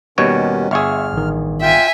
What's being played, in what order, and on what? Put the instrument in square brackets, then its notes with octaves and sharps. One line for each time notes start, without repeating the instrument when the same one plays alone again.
[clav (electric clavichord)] D#2 B2 C#5 [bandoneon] D#3 C#4 [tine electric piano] G3 F#5
[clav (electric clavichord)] G1 G#4 [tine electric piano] E5 C#6 E6 [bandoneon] F6
[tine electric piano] A1 D#3
[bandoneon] F4 G5 [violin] E5 G#5